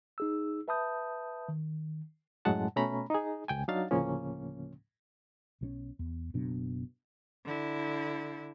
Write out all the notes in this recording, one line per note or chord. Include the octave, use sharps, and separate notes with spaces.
D#4 G#4 E6
B4 E5 A5 B5 D#6 G6
D#3
F#2 A2 F#3 G#3 F#5 A5
B2 A3 C#4 A#5 B5
D#4 G#4
C#2 G5 G#5
F#3 D4 D#4 F5 A6
D2 A2 C#3 F3 A#3 C#4
B1 D#3 C#4
E2
F#1 B2 F#3 D4
D3 E4